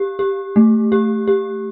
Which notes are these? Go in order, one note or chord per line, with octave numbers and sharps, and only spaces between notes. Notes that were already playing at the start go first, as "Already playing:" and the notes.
Already playing: G4
G4
A3
G4
G4